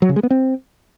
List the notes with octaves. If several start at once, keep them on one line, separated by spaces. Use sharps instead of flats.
F#3
C#3
G#3
B3
C4